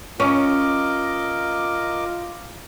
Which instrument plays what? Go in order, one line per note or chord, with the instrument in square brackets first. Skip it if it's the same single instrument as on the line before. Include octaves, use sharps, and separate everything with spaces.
[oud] C#4 [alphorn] F4 [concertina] A#4 D#5 D6